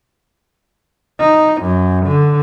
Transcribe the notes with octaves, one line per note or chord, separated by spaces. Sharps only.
D#4
F#2
D3